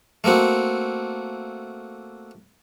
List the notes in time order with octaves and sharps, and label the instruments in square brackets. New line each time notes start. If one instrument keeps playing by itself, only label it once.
[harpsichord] A3 A#3 C4 F#4